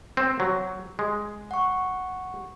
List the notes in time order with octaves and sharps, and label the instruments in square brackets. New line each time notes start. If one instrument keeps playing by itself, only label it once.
[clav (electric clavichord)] C4
F#3
G#3
[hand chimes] F#5 C#6